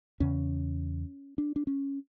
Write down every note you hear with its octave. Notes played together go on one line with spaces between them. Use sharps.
E2 C#3 C#4
D4
D4
C#4